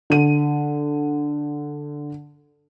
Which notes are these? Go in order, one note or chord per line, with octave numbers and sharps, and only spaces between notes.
D3 D#7